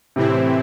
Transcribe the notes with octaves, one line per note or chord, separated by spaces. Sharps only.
A2 C3 E3 C4 E4